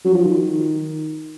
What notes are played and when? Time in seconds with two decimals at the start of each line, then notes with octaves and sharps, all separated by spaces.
0.04 F#3
0.15 F3
0.25 D#3